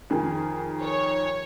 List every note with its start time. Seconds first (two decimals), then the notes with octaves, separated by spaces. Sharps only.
0.10 F2 D#3 G#4
0.83 C#5